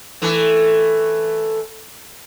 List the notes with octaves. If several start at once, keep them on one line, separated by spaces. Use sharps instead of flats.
E3 A3